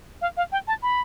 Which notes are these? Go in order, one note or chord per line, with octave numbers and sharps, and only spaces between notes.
F5
F5
G5
A5
B5